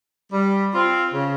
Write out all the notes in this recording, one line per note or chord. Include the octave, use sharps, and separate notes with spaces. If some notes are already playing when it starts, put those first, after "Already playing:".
G3
C4 F4
C#3